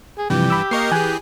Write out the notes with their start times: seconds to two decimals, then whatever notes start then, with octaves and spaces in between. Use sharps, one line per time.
0.18 G#4
0.30 G2 C3 E3 F3 G4
0.50 B5 D6 E6
0.71 A#3 A#4 D#5 C#6 C7
0.92 E3 G#4 G#5 F#6